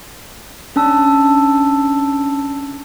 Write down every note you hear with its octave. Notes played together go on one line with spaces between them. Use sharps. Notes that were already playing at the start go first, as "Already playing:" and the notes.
C#4 D4 A5 E6